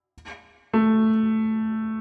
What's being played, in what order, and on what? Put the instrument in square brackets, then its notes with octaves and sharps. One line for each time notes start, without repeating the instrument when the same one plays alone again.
[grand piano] A3